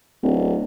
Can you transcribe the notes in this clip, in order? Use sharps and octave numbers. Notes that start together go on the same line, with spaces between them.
D1